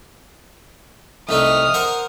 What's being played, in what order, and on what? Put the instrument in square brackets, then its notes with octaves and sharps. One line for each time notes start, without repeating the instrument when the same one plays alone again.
[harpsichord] C2 A3 D#4 [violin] D#6 F6
[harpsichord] A#4 C5 F#5